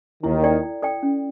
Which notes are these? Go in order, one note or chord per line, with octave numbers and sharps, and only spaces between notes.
D#2 D#3 E4
A4 D5 G5
E4
A4 D5 G5
C#4